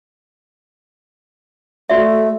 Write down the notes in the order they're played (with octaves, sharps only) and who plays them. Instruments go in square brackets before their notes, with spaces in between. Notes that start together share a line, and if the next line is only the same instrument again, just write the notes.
[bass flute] A3 [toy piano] F#4 D5 E5